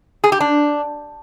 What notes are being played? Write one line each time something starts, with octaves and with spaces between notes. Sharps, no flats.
G#4
G4
D4